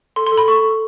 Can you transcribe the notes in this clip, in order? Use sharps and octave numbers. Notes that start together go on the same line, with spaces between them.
A4 C6
C6
A4
B5
A4 C#6
A4